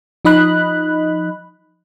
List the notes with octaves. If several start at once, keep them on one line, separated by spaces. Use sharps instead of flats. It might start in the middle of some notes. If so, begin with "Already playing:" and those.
F3 D#4 D#5 B5 F#6